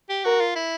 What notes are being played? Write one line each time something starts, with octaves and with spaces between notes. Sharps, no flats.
G4
F#4 A#4
F4
E4